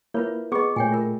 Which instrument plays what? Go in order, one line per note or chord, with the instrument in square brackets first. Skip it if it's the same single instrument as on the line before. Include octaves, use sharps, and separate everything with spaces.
[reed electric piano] A#3 E4 [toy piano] F4 B4 C#5
[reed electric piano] B3 C#6 [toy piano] G#4 D#5
[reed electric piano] A#2 A3 [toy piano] C#5 G5 G#5
[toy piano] F4 A#4